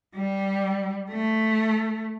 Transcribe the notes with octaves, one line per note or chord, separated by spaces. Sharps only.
G3
A3